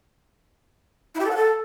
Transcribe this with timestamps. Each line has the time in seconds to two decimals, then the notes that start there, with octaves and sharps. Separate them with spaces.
1.15 E4
1.20 G4
1.25 A4
1.30 F#5
1.36 A4